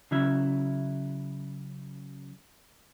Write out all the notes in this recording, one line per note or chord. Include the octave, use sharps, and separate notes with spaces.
C#3 F#3 C#4 E4 E5